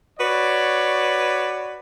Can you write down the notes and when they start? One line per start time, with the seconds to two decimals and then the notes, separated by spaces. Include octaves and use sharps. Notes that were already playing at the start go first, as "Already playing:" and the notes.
0.20 F#4 B4 C#5 D5